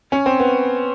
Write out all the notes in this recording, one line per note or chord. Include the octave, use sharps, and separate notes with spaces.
C#4
C4
B3